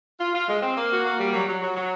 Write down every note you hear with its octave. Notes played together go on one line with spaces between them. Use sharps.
F4
F4
G#3
C4
A#3
F#4
A#3
G3
F#3
F#3
F#3
F#3